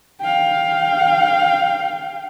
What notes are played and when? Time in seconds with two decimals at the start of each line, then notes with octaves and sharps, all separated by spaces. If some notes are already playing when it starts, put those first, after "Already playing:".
0.21 F5 G5